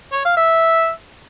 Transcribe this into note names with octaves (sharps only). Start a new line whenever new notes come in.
C#5
F5
E5